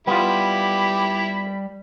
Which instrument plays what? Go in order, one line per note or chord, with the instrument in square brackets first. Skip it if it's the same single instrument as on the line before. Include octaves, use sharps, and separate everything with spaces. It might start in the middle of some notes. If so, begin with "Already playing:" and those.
[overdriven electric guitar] G3 [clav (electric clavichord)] B3 F4 [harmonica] E4 G4 [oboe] B5